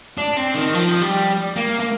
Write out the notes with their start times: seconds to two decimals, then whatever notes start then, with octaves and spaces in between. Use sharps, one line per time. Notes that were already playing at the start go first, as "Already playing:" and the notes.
0.18 D4
0.37 C4
0.55 D#3
0.74 F3
1.02 G3
1.56 A#3
1.80 A#3